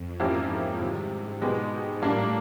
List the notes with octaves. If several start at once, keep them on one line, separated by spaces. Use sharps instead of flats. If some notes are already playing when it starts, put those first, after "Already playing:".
Already playing: F2
G#2 F3 A#3 C#4 E4 G4
C3 D#3 G3
B2 G#3 B3 D#4 G4
G#2
A2 G3 A#3 D4